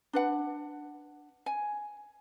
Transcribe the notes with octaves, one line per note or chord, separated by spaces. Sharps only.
D4 B4 F#5
G#5